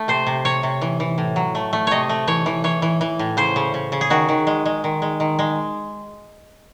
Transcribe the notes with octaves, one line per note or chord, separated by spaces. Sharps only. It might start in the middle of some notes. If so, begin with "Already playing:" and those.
Already playing: A3
C3 C5
C3
C3 C#5
C3
E3
E3
A2
F#3
A3
A3
C3 C#5 D#5
A3
E3 C#5
E3
E3 C#5
E3
E3
A2
C#3 C5
C#3
C#3
C#3
G#4
D#3 F#4
D#3
G#3
G#3
D#3
G#3
D#3
G#3